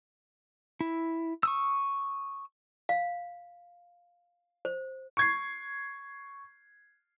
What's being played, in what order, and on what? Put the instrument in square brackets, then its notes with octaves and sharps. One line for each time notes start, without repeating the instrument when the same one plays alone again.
[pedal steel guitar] E4
C#6 D#6 E6
[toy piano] F5
C5
[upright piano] C#6 G#6 C7